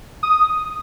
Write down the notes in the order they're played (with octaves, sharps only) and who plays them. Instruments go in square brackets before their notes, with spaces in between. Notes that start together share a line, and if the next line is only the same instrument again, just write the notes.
[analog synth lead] D#6